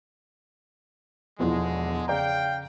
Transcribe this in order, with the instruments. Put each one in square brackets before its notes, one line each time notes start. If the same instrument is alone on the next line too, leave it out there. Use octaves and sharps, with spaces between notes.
[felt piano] E1 E2 F3 [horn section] D3 G#3
[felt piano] C#3 D5 A#5 [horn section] F5 G5